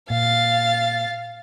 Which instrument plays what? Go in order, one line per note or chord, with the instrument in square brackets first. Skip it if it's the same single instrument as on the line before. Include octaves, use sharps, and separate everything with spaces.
[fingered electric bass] A#2 [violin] F5 A6